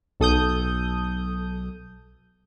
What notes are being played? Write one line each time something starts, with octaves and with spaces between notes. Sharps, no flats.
B1 A4 D#6 G6